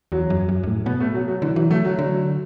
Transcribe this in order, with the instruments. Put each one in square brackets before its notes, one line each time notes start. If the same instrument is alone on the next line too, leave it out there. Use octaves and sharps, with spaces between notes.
[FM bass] E2 [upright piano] F#3
[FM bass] F#2
F#2
F#2
A2
[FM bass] B2 [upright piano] B3
[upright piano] A3
F#3
F#3
[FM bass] D3 [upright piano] E3
[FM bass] E3 [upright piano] F#3
[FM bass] F#3 [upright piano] A3
[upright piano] F#3
[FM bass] D3